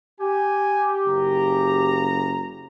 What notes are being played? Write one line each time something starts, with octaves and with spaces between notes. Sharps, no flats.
G4 G#5
F#1 C#3 A#5